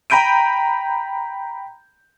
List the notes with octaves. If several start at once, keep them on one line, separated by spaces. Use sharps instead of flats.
G5 A#5 B5 G6 D7 D#7